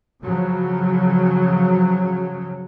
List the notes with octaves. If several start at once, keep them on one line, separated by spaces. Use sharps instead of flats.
C#3 F3 F#3